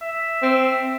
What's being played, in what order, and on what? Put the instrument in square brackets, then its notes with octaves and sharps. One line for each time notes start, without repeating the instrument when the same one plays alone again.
[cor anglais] E5
[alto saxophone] C4